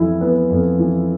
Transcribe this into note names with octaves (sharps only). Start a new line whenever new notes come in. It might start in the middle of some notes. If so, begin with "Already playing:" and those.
Already playing: F2 E3 E4
B3
F2
E3